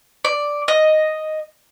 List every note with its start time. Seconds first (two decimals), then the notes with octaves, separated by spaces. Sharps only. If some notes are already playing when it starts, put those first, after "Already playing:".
0.25 D5
0.68 D#5